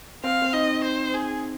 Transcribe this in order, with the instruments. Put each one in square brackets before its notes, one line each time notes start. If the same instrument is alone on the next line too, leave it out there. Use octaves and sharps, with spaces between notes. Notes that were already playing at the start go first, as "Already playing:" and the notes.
[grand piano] C4 [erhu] F5
[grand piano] C4
[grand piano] D#4 [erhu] D#5
[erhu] C5
G#4